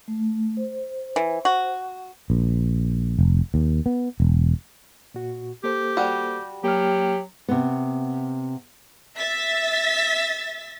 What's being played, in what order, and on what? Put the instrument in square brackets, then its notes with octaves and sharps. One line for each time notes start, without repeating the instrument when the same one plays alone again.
[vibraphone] A3
C5
[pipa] E3
F#4
[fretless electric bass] A#1
F1
D#2
B3
E1
[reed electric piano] A#2 F#4
[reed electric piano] A#3 A4 C5 [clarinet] G4
[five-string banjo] G3 F#4
[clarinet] F#3 [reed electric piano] A#3 F6 [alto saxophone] G4
[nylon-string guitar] C3 B3
[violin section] E5 A6 B6